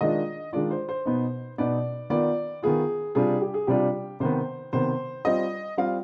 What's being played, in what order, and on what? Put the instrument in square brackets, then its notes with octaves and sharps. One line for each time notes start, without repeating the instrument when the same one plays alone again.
[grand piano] D#3 G#3 D4 F4 [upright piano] D#5
[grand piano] D#3 G#3 D4 F4 [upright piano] D5
[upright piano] C5
C5
[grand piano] B2 B3 D#4
[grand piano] B2 B3 D#4 [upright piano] D5
[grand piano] D#3 B3 F4 [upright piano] D5
[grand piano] D#3 B3 F4 [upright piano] G#4
[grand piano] C3 G3 D4 F4 [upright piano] G#4
[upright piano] G4
G#4
[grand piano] C3 G3 D4 F4 [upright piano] G4
[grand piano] C3 D#3 B3 [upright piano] C5
[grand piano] C3 D#3 B3 [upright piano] C5
[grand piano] G3 C4 F4 [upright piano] D#5
[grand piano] G3 C4 F4 [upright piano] F5